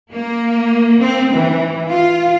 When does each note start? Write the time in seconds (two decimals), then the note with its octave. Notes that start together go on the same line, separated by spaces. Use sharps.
0.11 A#3
1.00 C4
1.33 E3
1.90 F4